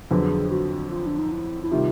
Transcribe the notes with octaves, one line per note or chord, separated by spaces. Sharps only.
F2 D3 F#3 B3 G#4
F#4
F4
D4
D#4
E4
E4
C3 D#3 G3 F4